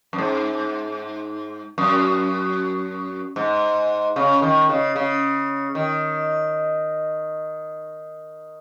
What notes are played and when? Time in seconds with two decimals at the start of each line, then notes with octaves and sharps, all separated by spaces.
0.13 F#2
0.18 G#2
1.78 F#2
3.36 G#2
4.16 C#3
4.42 D#3
4.69 C#3
4.96 C#3
5.75 D#3